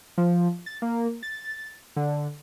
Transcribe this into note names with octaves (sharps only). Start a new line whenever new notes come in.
F3
A6
A#3
A6
D3